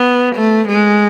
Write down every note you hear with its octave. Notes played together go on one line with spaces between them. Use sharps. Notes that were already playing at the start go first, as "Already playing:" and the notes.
Already playing: B3
A3
G#3